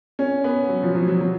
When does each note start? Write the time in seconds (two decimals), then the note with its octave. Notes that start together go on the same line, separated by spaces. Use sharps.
0.19 C#4
0.44 B3
0.69 F#3
0.83 F3
0.95 F#3
1.08 F#3
1.21 F#3